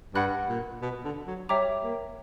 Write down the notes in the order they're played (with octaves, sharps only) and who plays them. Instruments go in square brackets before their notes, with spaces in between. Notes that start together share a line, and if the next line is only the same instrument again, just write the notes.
[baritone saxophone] G2 [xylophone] F#5 B5 F#6
[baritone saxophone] A#2
B2
D3
F#3
[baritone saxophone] G3 [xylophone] C#5 E5 G5 A#5 D6
[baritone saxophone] A#3